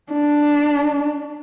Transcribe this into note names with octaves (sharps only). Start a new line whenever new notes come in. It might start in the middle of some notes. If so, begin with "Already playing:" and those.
D4